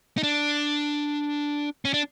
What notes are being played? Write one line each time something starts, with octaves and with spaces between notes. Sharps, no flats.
D#4
D4
C#4
D4